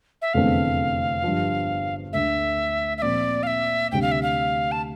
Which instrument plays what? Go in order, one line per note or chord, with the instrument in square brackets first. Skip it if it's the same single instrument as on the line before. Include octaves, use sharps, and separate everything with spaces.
[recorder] E5
[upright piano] F1 E2 D3 A3 C4 [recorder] F5
[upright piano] G1 G2 F3
[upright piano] D2 D3 A3 [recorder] E5
[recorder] E5
[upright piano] A#2 F3 C4 [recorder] D5
[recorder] F5
E5
[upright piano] D2 C3 G3 [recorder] G5
[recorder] F5
E5
F5
A5